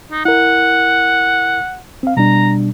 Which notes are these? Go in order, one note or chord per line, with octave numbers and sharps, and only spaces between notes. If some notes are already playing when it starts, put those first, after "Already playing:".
D#4
E4 A#4 F#5
C4 F5
B2 G3 D4 A#5